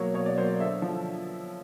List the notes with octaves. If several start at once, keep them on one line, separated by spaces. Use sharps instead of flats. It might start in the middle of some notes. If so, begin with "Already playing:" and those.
Already playing: B2 F#3 A#3 C#5
B2 C#5
D5
F#3 A#3 C5
D5
D3 E5
F3